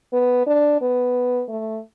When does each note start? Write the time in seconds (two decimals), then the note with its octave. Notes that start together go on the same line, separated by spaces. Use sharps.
0.13 B3
0.47 D4
0.81 B3
1.49 A3